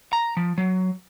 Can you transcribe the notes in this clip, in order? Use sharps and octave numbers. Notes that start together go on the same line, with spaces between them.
A#5
F3
F#3